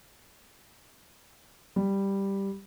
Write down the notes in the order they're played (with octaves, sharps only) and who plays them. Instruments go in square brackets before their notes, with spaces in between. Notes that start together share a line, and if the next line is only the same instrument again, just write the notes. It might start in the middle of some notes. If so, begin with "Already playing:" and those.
[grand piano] G3